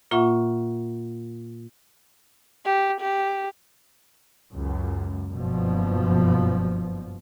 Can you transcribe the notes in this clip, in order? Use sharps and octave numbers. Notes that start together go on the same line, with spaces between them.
A#2 A#3 F4 E5 F#5 C#6
G4
G4
C#2 F#2
F#1 G2 B2 F3